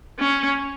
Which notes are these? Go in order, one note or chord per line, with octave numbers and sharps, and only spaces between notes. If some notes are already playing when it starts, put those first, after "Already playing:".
C#4